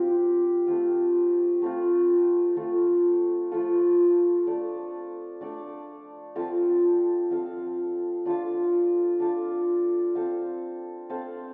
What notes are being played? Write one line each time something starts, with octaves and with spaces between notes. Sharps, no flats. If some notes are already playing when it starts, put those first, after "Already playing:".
Already playing: F3 C4 G4 F5
A3 C4 F4
A3 C4 F4
F3 A3 F4 A4
F3 A3 F4 A4
A3 D4 A4 D5
A3 D4 A4 D5
F3 C4 A4 F5
F3 C4 A4 F5
D4 F4 A4 F5
D4 F4 A4 F5
C4 A4 C5 F5
C4 A4 C5 F5